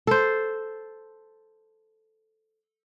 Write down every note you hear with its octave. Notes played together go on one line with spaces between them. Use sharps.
A4 C5